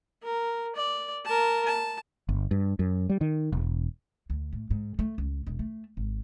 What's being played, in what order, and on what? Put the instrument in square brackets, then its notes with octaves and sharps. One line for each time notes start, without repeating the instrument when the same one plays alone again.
[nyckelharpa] A#4
D5
A#4 A5
A5
[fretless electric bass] G1
G2
F#2
G3
D#3
E1
[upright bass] D2
A2
G#2
A3
C#2
E1
A3
G#1